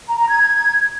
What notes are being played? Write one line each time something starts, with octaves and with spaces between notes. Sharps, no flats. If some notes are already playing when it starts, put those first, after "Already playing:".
A#5
A#5
G#6